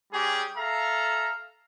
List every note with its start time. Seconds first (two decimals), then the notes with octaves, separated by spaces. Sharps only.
0.12 G3 C#4 G4 G#4
0.56 A4 E5 F5 A#5